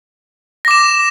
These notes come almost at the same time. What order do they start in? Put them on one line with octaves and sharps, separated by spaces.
A#6 D6 E7